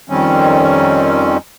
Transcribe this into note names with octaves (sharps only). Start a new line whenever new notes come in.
F2 D#3 G3 C4 C#4